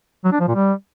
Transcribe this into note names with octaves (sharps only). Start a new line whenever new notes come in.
F#3
D4
F3
A#2
G3